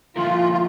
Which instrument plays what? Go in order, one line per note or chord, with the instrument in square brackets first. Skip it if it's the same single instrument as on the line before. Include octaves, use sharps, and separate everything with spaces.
[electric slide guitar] D3 F3 A#3 E4 A#4 [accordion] F4
[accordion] F4